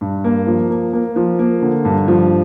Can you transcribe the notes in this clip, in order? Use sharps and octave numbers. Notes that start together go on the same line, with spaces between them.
G2
A#3
F3
A#3
A#3
F3
A#3
D3
G2
F3